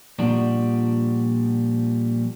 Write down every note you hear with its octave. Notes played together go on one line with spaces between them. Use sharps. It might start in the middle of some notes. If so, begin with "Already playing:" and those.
A#2 F3 G3 D4 F#4